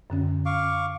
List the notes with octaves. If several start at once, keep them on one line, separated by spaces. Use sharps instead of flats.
F#2 D3 C#4
F5 C#6 D6